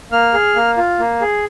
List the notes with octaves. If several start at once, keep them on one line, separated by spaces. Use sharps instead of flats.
A#3 F6
G#4
A#3
F4
A#3
G#4